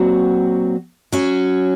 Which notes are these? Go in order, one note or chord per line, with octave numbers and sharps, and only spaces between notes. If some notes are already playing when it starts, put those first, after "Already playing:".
Already playing: A#2 F#3 C4 F#4
F#3 C#4 F#4